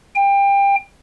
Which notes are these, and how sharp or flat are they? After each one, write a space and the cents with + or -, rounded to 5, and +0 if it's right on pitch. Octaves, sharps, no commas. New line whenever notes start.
G5 +25